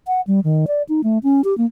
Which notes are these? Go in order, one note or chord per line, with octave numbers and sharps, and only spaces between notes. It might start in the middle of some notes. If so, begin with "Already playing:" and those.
F#5
G3
D#3
D5
D#4
A3
C#4
G4
A#3